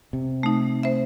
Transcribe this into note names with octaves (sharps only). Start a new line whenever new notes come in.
C3
A3 D#4
C5 E5